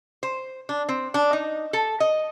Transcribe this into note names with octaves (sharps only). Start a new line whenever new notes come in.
C5
D4
C4
D4
D#4
A4
D#5